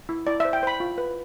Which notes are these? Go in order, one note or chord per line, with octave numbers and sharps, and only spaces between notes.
E4
E4 D5
E5
C5
G5
C5 B5
F4
B4